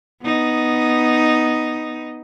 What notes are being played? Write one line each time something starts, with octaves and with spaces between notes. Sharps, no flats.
B3 D#4